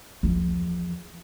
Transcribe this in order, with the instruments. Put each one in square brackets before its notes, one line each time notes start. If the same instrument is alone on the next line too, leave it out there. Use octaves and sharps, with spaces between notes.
[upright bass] E2 F3